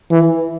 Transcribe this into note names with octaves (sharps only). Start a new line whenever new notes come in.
E3